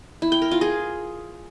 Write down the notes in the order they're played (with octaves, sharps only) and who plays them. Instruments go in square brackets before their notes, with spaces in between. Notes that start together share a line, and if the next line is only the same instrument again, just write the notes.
[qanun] E4
G5
A#4
F4
G#4